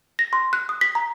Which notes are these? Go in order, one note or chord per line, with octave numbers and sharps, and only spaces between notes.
A#6
C6
F#6
D#6
B6
A#5